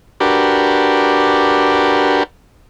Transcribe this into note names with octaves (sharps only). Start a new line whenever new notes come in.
D4 F#4 G4 A#4 B4